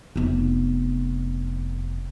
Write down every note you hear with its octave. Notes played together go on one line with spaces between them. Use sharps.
F1 B3